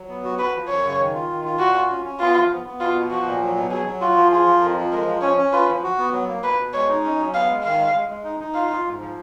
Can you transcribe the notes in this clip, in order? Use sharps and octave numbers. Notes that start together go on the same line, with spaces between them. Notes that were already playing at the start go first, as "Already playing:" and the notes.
Already playing: F#3
B3
F#4
F#4 B4
F3
F#2 C#5
C#3
D#3
F4
D#3
F4
A#2 F#4
F4
C#4
C#4
B3 F4
F3
B3
B3
B2 F4
B2
F3 F#4
A#2
F#3
B2
F#3 G#4
F#3
F4 F#4
F3
F4 G#4
F3
F2 A#4
F3
G#3 A#4
F3
C#4 C#5
C#4
F4 B4
F3
F#4
B3
F#3
A#3
B2 B4
B2
G#3 C#5
D#4
C#4
F#3
B3 F5
G#3
D#3 F5
G#3
G#3
G#3
D#4
D#4
F4 F5
F4
G#2
F3